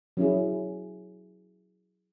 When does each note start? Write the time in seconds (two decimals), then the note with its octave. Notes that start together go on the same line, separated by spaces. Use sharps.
0.17 F#3 C#4 E4 G#4